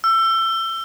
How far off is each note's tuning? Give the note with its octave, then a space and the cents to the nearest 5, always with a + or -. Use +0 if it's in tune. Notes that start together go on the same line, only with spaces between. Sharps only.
E6 +25